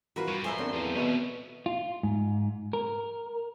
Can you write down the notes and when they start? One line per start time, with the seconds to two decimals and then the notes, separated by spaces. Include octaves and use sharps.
0.16 E3 F4 F#4 A#4 B4
0.28 G2 C#6
0.44 F2 F3 B4 E5 G#5 A#5 C6
0.58 D3 C4 A4 A#4
0.73 E2 F3 G3
0.96 B2 D#3 B3 C#4 E5
1.66 F4
2.03 G#2
2.73 A#4